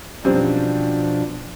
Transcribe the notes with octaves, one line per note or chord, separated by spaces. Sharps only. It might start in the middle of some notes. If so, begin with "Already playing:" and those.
F#2 B2 F3 G3 C4 D4